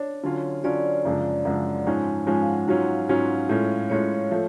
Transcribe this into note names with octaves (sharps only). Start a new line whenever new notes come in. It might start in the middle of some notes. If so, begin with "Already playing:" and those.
Already playing: D4 C#5
D3 F#3 C#4 F4
D3 F#3 C#4 F4 D5
F#2 C#3 F3 G#3 D4
F#2 C#3 F3 G#3 D4 F#5
G#2 F3 G#3 C#4 G#5
G#2 F3 G#3 C#4 G#5
F5
F#5
G#2 F#3 C#4 F4 F#5
F5
G#2 F#3 C#4 F4
A2 G#3 C#4 F4
A2 G#3 C#4 F4 C#5
F3 A3